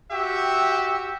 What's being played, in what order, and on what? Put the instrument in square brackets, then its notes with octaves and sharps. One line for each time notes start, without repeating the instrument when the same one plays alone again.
[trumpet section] F#4 G4 E5 [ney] G5